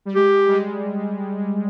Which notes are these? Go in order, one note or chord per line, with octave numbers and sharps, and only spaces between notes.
G3
G#3 G4
G3
G#3